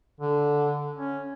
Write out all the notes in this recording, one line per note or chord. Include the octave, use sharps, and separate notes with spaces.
D3
C#4